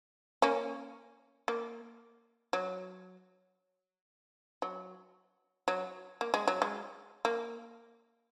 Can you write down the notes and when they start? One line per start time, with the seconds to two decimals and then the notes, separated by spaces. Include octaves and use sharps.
0.42 A#3 C#4
1.48 A#3
2.53 F#3
4.62 F#3
5.68 F#3
6.21 A#3
6.34 G#3
6.48 F#3
6.62 G#3
7.25 A#3